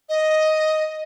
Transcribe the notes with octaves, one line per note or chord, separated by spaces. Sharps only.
D#5